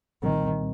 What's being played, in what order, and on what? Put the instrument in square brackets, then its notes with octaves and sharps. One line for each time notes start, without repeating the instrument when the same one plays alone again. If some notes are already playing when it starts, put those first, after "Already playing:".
[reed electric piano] C2 A#2 G3 C4 [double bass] D#3